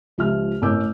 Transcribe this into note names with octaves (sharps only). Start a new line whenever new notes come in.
C#2 F3 G4 E5 F6
A1 A#4 C#5 D6 E6 G6